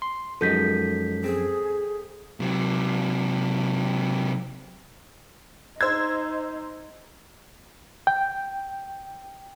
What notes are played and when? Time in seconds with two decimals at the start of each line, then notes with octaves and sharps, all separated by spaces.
0.02 C6
0.41 F#2 F3 F#3 G#3 D#4 A4 G6 B6
1.24 C4 G#4
2.40 C3 F#3
5.81 D#4 C5 E6 G#6
8.07 G5